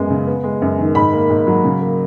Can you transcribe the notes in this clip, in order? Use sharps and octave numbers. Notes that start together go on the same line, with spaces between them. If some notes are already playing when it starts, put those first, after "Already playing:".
Already playing: F#2 G#3 B3
C#3
B3
G#3
F#2
D#3
G#2 B5
A#3
G#2
F#3
C#3
A#3